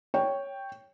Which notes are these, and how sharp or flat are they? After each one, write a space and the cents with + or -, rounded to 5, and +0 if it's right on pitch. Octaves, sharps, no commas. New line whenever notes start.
C#5 +0 G5 +0